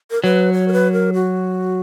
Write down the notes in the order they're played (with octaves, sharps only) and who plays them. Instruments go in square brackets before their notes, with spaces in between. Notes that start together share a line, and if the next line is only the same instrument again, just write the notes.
[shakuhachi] A#4
[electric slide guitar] F#3 [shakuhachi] B4
[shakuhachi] C#5
A#4
B4
A#4
F#4